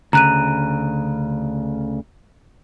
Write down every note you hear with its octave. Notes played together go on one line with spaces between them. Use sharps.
D2 C#3 A#5 F#6 D#7